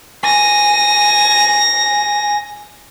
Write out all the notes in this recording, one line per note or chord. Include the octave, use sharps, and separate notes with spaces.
G#5 A#6